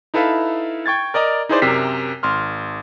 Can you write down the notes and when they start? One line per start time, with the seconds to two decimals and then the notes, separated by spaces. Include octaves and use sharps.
0.14 D#4 E4 A4 B4 E5 F5
0.86 G5 C#6 G#6 A6
1.14 A#4 D5 D#5 A#5
1.49 D#4 E4 G#4 B4 C5 D5
1.62 F#2 C3 G4 A#4 B6 C7
2.23 G#1 C6 F6